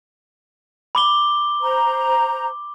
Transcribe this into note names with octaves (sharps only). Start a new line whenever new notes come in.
B5 D6 G7
C5 A#5